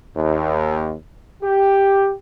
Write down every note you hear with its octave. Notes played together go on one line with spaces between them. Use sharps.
D#2
G4